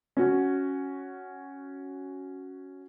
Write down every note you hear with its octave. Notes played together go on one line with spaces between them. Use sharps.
C#4 F#4